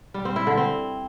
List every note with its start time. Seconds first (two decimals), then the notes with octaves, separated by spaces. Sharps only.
0.14 G3
0.25 C4
0.36 E4
0.47 D3
0.57 C4